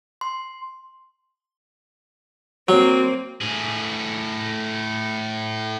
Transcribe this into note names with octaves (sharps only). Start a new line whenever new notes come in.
C6
F#3 A#3 C4
A2 G#4